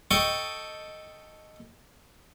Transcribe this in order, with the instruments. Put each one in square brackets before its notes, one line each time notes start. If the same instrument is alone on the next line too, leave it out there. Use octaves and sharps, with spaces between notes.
[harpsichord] A4 D#5 G5 A5 C#6